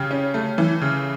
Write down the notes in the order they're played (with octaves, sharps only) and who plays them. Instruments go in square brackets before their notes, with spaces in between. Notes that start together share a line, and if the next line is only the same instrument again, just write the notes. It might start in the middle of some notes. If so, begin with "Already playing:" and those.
Already playing: [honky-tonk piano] C#3 G4
C#4
A3
E3
C#3